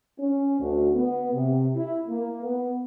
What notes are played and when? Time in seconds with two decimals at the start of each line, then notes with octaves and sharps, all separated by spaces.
0.18 C#4
0.60 D2
0.94 B3
1.33 C3
1.75 E4
2.08 A#3
2.44 B3